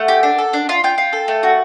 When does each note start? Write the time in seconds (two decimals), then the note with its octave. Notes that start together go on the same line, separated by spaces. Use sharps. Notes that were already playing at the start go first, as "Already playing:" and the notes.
Already playing: A3 F#5
0.08 G4
0.23 D4
0.38 A4
0.53 D4
0.69 F4
0.84 F4 G5
0.98 F4
1.13 A4
1.28 A3
1.43 F#4